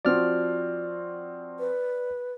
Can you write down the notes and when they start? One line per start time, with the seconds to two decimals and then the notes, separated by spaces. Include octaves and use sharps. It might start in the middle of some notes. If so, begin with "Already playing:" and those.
0.05 F3 C4 F#4 D5 F6
1.59 B4